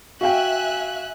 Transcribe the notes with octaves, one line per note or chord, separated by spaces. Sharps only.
F#4 E5 F5 G5 G#5 F#6